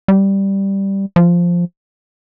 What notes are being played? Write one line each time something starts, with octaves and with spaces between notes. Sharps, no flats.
G3
F3